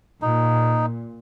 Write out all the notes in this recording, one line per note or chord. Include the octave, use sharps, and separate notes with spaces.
A#2 D#4